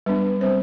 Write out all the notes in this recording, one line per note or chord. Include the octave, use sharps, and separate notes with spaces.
G3 B3 D4 B4
G3 C4 C5